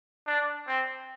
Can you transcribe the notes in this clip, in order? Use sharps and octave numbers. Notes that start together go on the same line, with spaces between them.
D4
C4